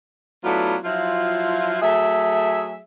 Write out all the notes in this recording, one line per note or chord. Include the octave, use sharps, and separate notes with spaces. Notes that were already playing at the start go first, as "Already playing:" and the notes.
F#3 A3 B3 D4 E4 F4
F3 F#3 E4 F4
F#3 A3 G#4 E5